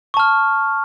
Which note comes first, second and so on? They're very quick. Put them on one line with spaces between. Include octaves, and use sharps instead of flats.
C#6 A5 F6